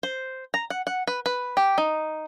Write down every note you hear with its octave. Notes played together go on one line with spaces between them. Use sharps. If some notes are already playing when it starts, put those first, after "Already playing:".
C5
A#5
F#5
F#5
B4
B4
G4
D#4